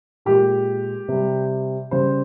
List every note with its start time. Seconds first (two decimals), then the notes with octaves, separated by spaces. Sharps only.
0.25 A#2 G#3 G4
1.08 C3 G3
1.91 C#3 G3 C5